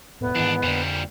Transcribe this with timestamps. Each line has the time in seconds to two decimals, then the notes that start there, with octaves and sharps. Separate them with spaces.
0.21 E1 A2 B3
0.35 D#2 G#2 D#3 E3 D4
0.63 F2 A#2 D3 G3